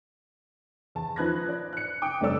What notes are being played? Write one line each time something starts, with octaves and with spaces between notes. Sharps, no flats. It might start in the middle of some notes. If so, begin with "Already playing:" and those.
E2 A5
F3 D#4 B4 F#6 G#6 A#6
D5
F#6 C#7
G5 D6 D#6
F1 G2 A3 D5 E6